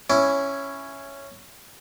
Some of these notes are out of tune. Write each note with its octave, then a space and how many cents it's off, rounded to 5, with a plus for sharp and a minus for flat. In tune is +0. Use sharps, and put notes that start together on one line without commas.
C#4 +0 E4 +10